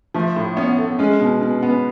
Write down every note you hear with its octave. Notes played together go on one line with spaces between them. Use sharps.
F3 A3
A2
B3 C#4
A3
G#3 C#4
B2
B2
B3